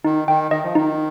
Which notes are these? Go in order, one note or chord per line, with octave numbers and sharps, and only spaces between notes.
D#3 D#4
D#3 G5
D#3 D#5
F3
D#3 D#4